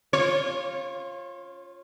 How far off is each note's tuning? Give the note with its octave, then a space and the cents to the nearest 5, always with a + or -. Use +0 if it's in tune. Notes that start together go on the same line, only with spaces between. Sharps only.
F4 +0 C#5 -30